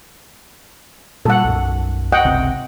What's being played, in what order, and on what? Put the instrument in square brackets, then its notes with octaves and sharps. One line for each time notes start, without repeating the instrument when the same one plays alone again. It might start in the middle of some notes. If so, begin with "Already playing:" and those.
[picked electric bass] A#2 G3 [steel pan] A4 F#5
[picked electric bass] B1 F#2
[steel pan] D#5 F#5 G5
[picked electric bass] G1 C#2 C3